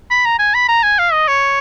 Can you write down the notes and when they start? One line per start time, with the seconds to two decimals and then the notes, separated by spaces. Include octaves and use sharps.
0.10 B5
0.25 A#5
0.39 G#5
0.54 B5
0.68 A#5
0.83 G#5
0.99 F5
1.12 D#5
1.28 C#5